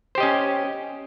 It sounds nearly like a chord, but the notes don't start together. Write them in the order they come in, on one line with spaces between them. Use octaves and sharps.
C5 G4 D#5 C#4